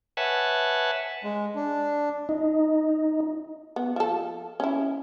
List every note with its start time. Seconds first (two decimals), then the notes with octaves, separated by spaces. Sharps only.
0.17 B4 C#5 E5 F#5 G#5 A5
1.24 G#3
1.55 D4
2.29 D#4
3.76 B3
3.96 F3 A4
4.60 C#4 E4